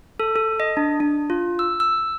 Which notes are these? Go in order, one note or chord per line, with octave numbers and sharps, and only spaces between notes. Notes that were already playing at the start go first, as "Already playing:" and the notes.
A4
A4
D#5
D4
D4
F4
E6
E6